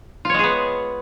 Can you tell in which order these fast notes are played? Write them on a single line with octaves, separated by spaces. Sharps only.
F4 C#5 G#3 G#4 B3